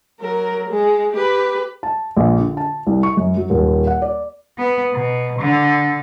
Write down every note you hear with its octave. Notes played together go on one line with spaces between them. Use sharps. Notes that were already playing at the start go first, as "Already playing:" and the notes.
F#3 A#4
G#3 G#4
G4 B4
A5
A#1
D3
A5
C2
C#6
F#2
F#3
D#1
F#5
D5
B3
B2
D3